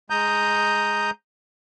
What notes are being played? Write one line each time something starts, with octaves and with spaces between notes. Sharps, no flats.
G#3 A#5 D#6 G6